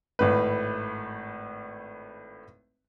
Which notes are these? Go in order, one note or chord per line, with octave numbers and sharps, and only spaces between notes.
G#1 A2 B4